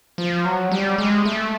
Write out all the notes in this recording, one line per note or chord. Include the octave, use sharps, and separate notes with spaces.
F3
F#3
G3
G#3
A3